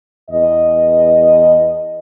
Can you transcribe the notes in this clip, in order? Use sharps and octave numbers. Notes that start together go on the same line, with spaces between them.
E2 D#5